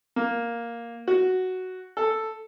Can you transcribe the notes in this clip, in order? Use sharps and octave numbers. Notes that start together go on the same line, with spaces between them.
A#3
F#4
A4